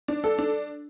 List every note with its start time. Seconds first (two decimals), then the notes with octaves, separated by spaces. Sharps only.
0.08 D4
0.24 A4
0.39 D4